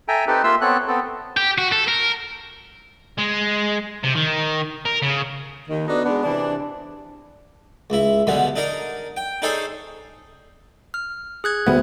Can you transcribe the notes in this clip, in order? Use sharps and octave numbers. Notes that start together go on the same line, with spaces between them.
A4 E5 G5 G#5 A#5
C4 D#4 G4 A4 B4
A#3 F4 E5 C6 E6
B3 C4 A4 C#5 F#6
B3 C4 A4
G4
F#4
A4
A#4
G#3
C3
D#3
A#4
C#3
D#2 D#3
B3 D4 D#4 F#4 A4
G#3 B3 D4
C3 E3 D4
C#2 E4
B2 D3 G3 G#3
D4 D#4 A#4 A#5
G5
D4 D#4 G#4 A4 C5 C#5
F6
G#4 F#6 G#6
D2 G3 A3 B3